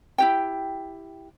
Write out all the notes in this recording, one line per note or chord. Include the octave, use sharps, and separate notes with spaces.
E4 G4 G5